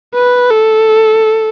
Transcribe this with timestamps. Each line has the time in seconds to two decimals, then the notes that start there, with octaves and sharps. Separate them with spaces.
0.15 B4
0.50 A4